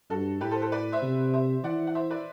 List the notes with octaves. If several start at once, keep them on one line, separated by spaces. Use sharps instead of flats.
G2 F#4 A4
A2 G4 B4
A4 C5
A4 C5
B4 D5
C5 E5
C3
C5 E5
E3 D5 F#5
F#5
C5 E5
B4 D5